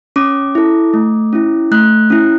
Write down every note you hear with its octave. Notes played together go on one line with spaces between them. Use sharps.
C#4 D6
E4 A4
A3
C#4 E4
A3 F#6
C#4 E4